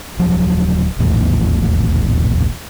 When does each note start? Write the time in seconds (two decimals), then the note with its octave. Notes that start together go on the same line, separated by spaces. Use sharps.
0.19 D#1 F3 F#3
0.98 D#1 A#1 E2 A2